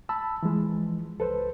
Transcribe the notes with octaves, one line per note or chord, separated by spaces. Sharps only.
A5 B5 E6
E3 F3 G#3
C#2 A4 B4 C5